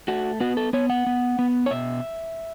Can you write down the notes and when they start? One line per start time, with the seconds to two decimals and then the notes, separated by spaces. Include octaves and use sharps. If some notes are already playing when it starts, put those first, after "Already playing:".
0.08 A3 F#4
0.40 B3 F#4
0.57 A4
0.73 B3 C#5
0.90 F#5
1.06 B3
1.39 B3
1.66 C#5
1.71 B2 E5